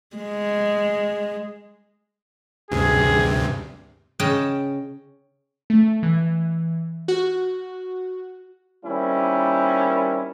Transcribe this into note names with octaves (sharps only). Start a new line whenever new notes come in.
G#3
D2 G2 C3 G#4
C#3 C#4 D#5 G5 A5
A3
E3
F#4
D#3 G3 A#3 C4 C#4 E4